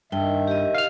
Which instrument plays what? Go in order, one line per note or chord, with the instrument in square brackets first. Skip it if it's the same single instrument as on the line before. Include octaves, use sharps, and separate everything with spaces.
[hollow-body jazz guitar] G2 [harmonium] D#3 E5 [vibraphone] G5
[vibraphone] G4 D#5
[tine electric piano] F5 F6